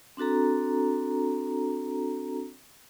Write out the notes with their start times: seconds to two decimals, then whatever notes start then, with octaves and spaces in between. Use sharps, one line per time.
0.17 C4 D4 F#4 A4 A#5